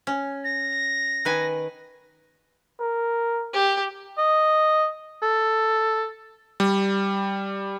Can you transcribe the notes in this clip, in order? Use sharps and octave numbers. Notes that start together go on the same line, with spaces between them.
C#4
A#6
D#3 B4 G#5
A#4
G4
D#5
A4
G3